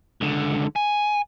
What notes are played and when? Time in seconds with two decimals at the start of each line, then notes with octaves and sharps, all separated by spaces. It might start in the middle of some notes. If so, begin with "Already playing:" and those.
0.21 C#2 D3
0.76 G#5